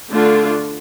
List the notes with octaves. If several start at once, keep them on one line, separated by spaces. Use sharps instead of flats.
D3 A3 D4 F4